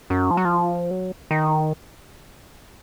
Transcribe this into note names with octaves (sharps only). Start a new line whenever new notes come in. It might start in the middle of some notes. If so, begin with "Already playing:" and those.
F#2
F3
F#3
F3
F#3
D#3